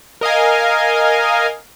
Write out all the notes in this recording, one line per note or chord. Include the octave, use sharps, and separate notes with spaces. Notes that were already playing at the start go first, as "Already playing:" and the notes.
A#4 D#5 F5 G#5